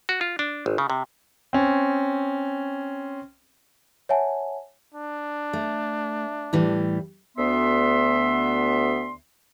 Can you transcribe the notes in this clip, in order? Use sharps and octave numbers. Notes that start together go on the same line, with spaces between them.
F#4
F4
D4
G#1
C#3
C3
C4 C#4
C#5 E5 F#5 G#5 A5
D4
A3
A2 E3 G3
D2 B3 E5 C6